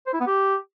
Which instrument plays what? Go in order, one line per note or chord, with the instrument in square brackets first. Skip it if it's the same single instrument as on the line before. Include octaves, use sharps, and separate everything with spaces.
[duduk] C5
E4
B3
G4